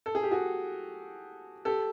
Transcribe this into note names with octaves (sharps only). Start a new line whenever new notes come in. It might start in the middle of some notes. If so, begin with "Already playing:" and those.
A4
G#4
G4
F#4 G#4
G4 A4